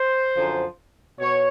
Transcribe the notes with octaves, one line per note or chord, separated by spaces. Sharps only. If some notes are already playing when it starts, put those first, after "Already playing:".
Already playing: C5
F#2 D3 F3
B2 C#5